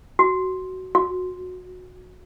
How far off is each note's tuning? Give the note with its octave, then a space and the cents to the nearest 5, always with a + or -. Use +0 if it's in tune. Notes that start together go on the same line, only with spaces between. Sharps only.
F#4 +10
F#4 -20